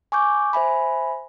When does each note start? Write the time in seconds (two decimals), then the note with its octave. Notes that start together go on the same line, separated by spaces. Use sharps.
0.12 G#5 C#6 D6 G6
0.53 C5 E5 G#5 B5